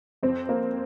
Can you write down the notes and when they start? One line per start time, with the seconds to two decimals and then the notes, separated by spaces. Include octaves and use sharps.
0.23 F2 C4
0.49 A#3